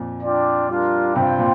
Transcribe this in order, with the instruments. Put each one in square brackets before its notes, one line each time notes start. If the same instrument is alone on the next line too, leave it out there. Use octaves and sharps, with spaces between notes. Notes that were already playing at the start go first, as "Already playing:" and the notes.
Already playing: [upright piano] F2 A#2
[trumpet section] D4 F4 D5 G5
G3 D4 F4 A#4
[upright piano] G2 C3 [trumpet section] F4 C5 G5
[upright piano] A#2